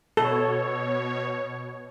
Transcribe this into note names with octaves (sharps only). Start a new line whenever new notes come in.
B2 A4 C#5